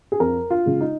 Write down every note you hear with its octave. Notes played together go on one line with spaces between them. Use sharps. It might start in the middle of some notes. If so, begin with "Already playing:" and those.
G#4
F2 A#4
F4
C#3 G#3
D#4